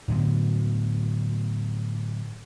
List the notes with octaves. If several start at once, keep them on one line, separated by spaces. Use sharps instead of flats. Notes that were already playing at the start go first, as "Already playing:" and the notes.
A2 D3 F#3 B3